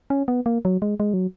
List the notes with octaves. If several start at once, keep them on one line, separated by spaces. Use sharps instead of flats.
C#4
B3
A#3
F#3
G#3
G#3
F#3